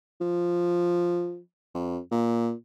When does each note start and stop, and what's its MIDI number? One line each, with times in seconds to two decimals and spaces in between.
0.21 1.38 53
1.74 1.99 41
2.12 2.53 46